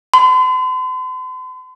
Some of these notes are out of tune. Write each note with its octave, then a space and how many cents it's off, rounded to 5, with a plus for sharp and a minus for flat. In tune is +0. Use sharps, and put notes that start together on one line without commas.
C6 -45